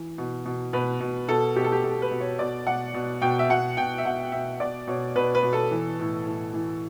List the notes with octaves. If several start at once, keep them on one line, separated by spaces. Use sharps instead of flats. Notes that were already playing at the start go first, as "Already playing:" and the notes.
Already playing: E3
B2
B2
B2 B4
B2
B2 A4
B2 G4
A4
G4
B2 A4
B4
B2
C#5
B2 D5
B2 F#5
B2
B2 G5
E5
B2 F#5
B2 G5
E5
B2 F#5
B2 E5
B2 D5
B2 C#5
B2 B4
B4
B2
A4
E3
A2
A2
E3